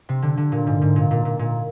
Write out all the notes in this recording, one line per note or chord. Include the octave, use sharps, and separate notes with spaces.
C3
D3
D3
A#2
G#2
G#2
A#2
A#2
A#2
A#2